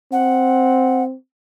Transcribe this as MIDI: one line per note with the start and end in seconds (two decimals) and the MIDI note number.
0.12 1.15 60
0.12 1.03 78